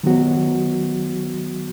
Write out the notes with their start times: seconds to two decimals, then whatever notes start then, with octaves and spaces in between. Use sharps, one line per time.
0.03 D#3 F#3 B3 F#4